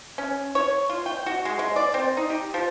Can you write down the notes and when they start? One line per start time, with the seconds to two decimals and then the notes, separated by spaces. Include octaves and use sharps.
0.18 C#4
0.55 C#5
0.90 F4
1.06 G5
1.26 F#4
1.45 G#3
1.59 G#3
1.76 D5
1.94 C4
2.17 D#4
2.30 G4
2.54 F3